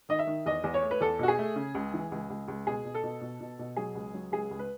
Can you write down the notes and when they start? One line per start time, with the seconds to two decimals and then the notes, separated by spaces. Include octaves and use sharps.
0.09 D#3 D#5
0.19 E5
0.27 D#3
0.46 E2 D#5
0.64 E2
0.74 C#5
0.83 A3
0.91 B4
1.01 E2 A4
1.19 B2 F#4
1.28 G#4
1.39 A3
1.56 C#3
1.75 C#2
1.94 E3
2.12 C#2
2.30 C#2
2.48 C#2
2.67 B2 G#4
2.85 B2
2.94 A4
3.03 B2
3.21 B2
3.40 B2
3.59 B2
3.76 F#3 G#4
3.95 C#2
4.14 F#3
4.32 C#2 G#4
4.51 C#2
4.59 B4